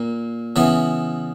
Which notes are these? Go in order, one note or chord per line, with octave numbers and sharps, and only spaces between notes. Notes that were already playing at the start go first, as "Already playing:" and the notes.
Already playing: A#2 A#3
C#3 E3 B3